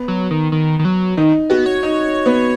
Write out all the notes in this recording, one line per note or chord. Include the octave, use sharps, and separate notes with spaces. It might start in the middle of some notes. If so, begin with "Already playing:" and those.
Already playing: B3
F#3
D#3
D#3
D#3
F#3
D#3 D#4
B3 F#4
C#5
D#4
B3